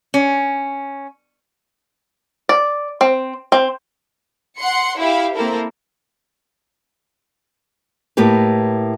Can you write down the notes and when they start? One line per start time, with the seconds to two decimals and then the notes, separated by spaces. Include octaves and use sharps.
0.14 C#4
2.49 D5
3.01 C4
3.52 C4
4.59 F#5 C6 C#7
4.98 E4 G4 E5 F5
5.35 A#3 C4 E4 A4 A#4
8.17 A2 A#3 G4 B4